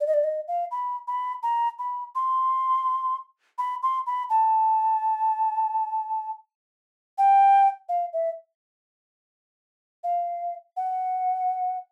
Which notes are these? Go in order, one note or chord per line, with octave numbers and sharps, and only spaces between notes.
D5
D#5
D5
D#5
F5
B5
B5
A#5
B5
C6
B5
C6
B5
A5
G5
F5
E5
F5
F#5